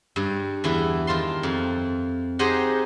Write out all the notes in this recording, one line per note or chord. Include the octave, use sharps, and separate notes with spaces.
G2
E2 E3 E4
D#3 F4 A5 C6
F2
D#4 G4 G#4 C5 D#5 F#5